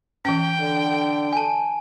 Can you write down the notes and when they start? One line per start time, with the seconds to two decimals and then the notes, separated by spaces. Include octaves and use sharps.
0.25 E3 C#4 G5
0.59 D3
1.33 G#5 A5